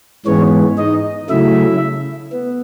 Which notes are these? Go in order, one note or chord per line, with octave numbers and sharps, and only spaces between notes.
G#2 E3 G#3 B3 C#4 C#5
D#4 D#5
C#3 F#3 A3 E4 E5
B3